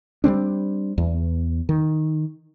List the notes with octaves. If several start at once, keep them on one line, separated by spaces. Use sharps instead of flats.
G3 G#3 C4 D4
E2
D#3